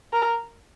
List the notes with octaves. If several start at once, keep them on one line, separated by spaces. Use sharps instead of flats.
A#4